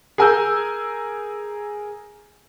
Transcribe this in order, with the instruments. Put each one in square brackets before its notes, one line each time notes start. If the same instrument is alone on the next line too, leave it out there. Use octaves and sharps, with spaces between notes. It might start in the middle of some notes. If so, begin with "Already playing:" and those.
[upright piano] G#4 A#4 G#5 A#5 E6 G6